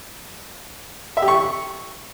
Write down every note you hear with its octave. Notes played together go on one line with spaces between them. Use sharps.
E5
G4
C#6